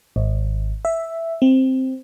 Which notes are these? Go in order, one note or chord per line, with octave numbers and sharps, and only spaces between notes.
G#1
E5
C4